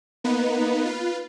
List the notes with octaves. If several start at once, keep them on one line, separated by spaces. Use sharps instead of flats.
A#3 B3 D#4 B4
F4 B4